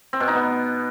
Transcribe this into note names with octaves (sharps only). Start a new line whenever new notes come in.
C4
B2
D#4
B3